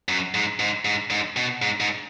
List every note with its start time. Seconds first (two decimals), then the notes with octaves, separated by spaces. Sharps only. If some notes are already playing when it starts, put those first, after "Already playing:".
0.09 F#2
0.34 G#2
0.60 G#2
0.85 G#2
1.11 G#2
1.37 B2
1.62 G#2
1.81 G#2